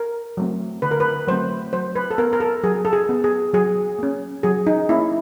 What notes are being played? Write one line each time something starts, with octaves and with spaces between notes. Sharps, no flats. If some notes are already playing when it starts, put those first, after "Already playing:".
Already playing: A#4
F#3 A3 C4
D3 B4
A#4
B4
F#3 A3 C4 C5
F#3 C5
B4
A4
B3 A#4
A#4
A4
F#3 G#4
A4
G#4
B3
G#4
F#3 G#4
A#3 C#4
F#3 G#4
D#4
A#3 C#4 E4